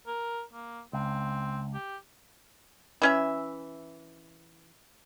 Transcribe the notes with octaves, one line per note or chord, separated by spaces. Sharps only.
A#4
A#3
C#2 C4
G4
E3 C#4 E5